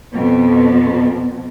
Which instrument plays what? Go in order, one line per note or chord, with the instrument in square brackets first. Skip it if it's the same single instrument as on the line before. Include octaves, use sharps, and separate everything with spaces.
[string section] F2 B2